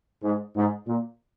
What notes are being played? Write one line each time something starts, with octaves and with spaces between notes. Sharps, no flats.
G#2
G#2
A#2